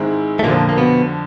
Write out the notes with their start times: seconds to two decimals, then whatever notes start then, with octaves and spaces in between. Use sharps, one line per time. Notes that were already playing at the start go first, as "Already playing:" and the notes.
Already playing: G#2 D#3 G#3 C4 E4
0.39 A3
0.44 F2 A#2 D3 F3 A#3
0.69 A#3
0.77 B2 B3